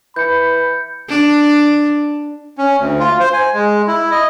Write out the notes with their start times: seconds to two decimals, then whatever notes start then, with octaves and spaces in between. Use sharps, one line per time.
0.16 E3 B5 G6 C#7
1.08 D4
2.58 C#4
2.79 D2
3.00 F4
3.20 C5
3.33 G#5
3.54 G#3
3.88 E4
4.12 D#5